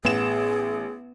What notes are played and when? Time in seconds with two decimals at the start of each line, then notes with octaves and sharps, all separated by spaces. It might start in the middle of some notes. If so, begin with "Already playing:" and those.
0.05 A1 B3 G#4 E7